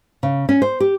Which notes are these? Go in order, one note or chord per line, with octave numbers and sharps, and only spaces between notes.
C#3
C#4
C5
G4